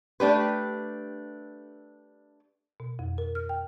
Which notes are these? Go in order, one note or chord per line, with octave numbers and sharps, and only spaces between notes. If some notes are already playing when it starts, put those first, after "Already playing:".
A3 D4 G4 B4
B2
F2
A#4
F6
G5